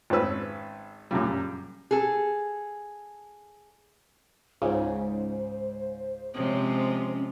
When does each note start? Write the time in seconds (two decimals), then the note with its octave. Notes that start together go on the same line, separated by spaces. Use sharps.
0.10 G#1 C4 C#4 B4 E6
1.11 F#2 A#2 C#3 G3
1.91 G#4 A4
4.62 C#2 G#2 C#3 C5
6.34 C3 F3 G#3 C#4